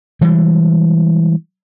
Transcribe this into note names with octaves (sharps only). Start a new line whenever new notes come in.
E3 G3 G#3